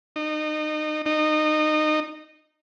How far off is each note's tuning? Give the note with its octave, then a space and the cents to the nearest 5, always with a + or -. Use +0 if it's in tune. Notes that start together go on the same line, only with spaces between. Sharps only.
D#4 -30
D#4 -25